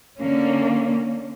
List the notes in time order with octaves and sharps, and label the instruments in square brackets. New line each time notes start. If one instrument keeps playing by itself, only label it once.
[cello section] D3 A#3 C#4